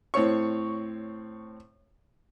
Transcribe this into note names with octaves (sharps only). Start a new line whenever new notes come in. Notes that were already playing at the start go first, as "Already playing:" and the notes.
A2 C4 C#5 C#6